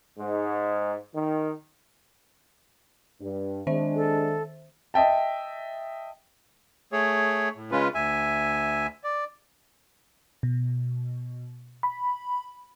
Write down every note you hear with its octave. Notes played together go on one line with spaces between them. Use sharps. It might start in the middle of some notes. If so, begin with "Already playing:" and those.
G#2
D#3
G2
D#3 G#3 D4 C5 E5
A4
D#5 E5 G5 A5
A3 G#4 C#5
A2
C#3 G#3 C#4 F4 B4
D2 E5 G#5
D5
B2
B5